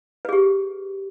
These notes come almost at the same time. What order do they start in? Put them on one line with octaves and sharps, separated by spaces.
B4 G#4 G4